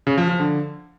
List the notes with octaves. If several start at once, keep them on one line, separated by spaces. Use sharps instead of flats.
C#3
F3
F3
D3